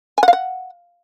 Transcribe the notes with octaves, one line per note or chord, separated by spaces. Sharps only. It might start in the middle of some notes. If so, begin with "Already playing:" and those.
G#5
F#5
F5
F#5